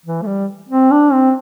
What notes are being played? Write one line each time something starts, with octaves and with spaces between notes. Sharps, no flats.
E3
A3
G3
C4
D4
C4